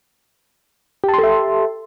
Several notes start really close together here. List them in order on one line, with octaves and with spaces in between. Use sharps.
G4 A5 C6 A4 E5